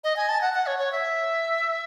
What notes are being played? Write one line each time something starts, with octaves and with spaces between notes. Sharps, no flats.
D#5
G#5
A5
F#5
F#5
C#5
C#5
E5